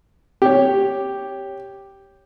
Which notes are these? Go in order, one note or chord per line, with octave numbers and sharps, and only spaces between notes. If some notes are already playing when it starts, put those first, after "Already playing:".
G4 C#5